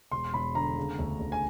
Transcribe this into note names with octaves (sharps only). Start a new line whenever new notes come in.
E1 C6
E1 B5
D3 A#5
C#3
D2
D2
G#5